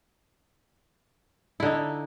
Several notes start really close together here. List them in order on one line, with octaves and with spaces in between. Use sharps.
E4 D3 D#4